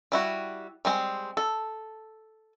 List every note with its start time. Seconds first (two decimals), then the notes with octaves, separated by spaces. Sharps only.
0.12 G3 E4 F#4
0.85 G3 G#3 C4
1.37 A4